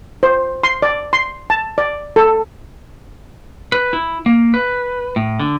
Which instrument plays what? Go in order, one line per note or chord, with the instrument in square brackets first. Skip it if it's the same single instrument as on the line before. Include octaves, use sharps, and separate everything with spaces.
[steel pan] C5
C6
D5
C6
A5
D5
A4
[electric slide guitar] B4
E4
A#3
B4
A2
D3